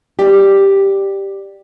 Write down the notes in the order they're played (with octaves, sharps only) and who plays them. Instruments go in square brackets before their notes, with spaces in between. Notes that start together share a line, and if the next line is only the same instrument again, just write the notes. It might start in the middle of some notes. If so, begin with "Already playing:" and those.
[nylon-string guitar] G4 D5